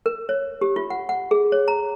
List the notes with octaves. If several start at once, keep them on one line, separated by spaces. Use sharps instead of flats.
A#4
C#5
G4
F4
F#5
F#5
G#4
C#5
A#5